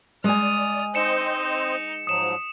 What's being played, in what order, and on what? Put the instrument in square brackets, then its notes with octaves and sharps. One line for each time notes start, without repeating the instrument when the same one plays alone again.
[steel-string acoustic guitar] G#3 G#5 [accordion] D5 [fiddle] D#6 F6
[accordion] C4 C5 D#5 [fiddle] D#4 [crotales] C#7 E7
[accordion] G#2 F3 F#3 [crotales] D#6 E7